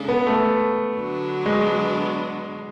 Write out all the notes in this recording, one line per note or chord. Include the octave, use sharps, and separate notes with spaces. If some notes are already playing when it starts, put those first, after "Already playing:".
Already playing: C#3 G#3 D4 A4
B3
A3
D3 F#3 B3 D4
G#3